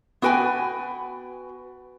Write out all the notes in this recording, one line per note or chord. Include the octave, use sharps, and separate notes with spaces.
B3 F#4 B4 G5 G#5